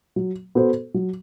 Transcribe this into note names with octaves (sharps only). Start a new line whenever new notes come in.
F#3
B3 F#4 A4 C5
F#3